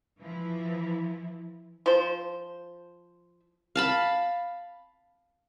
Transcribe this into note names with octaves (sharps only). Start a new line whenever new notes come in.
E3 F3 E4
F3 C5
F5 A5 B5